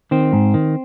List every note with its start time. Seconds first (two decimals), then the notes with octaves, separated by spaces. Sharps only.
0.11 D#3 C4
0.33 G#2
0.54 D#3